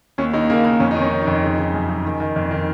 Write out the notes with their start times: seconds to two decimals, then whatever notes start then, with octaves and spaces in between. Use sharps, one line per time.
0.18 D#2 C#4
0.33 D#2 D#4
0.50 C#3 A#3
0.65 C#3 A#3
0.80 F2 C#4
0.91 D#3 D#4
1.02 C#4
1.12 D#3
1.22 D#4
1.27 F2
1.43 C#3
1.58 C#3
1.74 F#2
1.89 C#3
2.05 D#3
2.20 D#3
2.36 F2
2.51 D#3